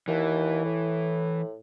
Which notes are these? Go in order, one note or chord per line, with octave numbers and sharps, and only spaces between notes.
D#2 E3
A2